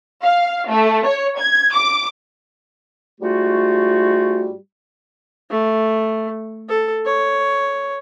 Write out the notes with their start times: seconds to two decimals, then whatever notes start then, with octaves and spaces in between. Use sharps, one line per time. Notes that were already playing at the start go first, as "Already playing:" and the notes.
0.23 F5
0.69 A3
1.06 C#5
1.38 G#6
1.73 D6
3.20 G#2 G3 A3 F4 F#4
5.51 A3
6.69 A4
7.05 C#5